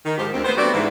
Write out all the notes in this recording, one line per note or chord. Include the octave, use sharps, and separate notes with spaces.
D#3
G#2 F3 G4
D2 C4
B3 C5
G3 A3 B3 C4 F#4 D5
G#2 E3